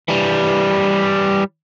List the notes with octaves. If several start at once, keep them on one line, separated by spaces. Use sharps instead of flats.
E3 G3